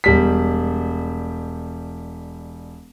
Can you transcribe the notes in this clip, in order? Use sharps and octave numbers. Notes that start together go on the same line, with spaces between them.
E1 G3 B6